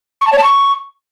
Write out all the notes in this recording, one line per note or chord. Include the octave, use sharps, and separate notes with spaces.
C#6
A5
C#5
A5
C#6